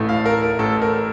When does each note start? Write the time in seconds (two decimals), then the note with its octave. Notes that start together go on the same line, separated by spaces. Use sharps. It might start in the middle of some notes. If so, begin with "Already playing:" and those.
Already playing: A1 A2 A3
0.09 F5
0.26 A#4
0.43 A#4
0.59 A1 A2 A3 A4
0.82 A#4